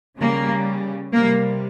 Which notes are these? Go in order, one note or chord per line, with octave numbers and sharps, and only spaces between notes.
C#3 G3 A#3
C3 G3 A#3